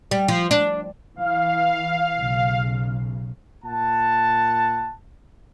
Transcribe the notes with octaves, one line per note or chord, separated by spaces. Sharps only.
G3
F3
D4
E3 F5
B1 C#3
A#2 F#5 A5